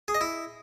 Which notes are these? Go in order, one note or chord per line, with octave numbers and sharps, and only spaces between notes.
G#4
D#5
E4